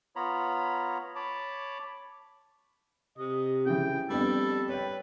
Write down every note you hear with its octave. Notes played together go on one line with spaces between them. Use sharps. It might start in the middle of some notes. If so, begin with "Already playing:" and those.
B3 F4 C#5 A#5 B5
C#5 A5 B5 D6
C3 D#5
C#3 E3 G5
F2 G3 B3 D4 A4
B4 C#5 G5